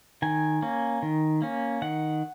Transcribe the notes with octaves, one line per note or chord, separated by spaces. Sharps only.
D#3 G#5
A#3 C#4
D#3
A#3 C#4
D#3 F#5